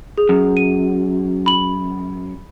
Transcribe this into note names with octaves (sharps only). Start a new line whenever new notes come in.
G#4
F#2
D#7
B5 F#7